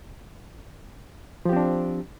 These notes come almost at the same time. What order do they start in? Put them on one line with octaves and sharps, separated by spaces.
F3 G4 C4 D4